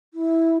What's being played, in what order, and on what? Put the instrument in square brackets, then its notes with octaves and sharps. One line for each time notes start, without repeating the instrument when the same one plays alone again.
[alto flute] E4